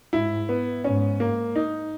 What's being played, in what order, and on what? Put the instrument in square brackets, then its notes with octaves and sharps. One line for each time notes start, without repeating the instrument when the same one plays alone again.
[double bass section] G#2 [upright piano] E4
[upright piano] B3
[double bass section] G#2 [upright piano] C#4
[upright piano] A#3
D#4